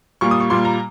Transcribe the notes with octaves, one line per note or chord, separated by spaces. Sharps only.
A#2 G3 A#3 C#6
D#6
C#6
A#2 G3 A#3 C6
A#5